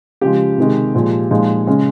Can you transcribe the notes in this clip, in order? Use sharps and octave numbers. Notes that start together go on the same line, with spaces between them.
C#3 F3 G#3 G4
C3 D#3 G#3
A#2 F3 G#3
A#2 F3 G#3 D#4
C#3 G#3 C#4